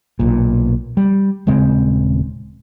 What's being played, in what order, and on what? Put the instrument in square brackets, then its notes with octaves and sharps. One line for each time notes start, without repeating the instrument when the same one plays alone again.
[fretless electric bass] B1 A#2
G3
D#1 C#3 G#3 C4